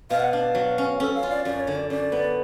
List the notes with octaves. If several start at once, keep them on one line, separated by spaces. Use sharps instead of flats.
B2 F5
F#5
D4 F5
F#3
C#4
C#4 A4
F5
F4
D5
F#2 D5
C#5
D3
D5
F#2 D5
B3